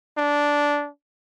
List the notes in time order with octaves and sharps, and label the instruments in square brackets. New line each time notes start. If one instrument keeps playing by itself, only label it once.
[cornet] D4